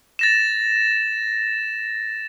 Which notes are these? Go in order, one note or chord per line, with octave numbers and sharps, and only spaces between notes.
A6 A#6 E7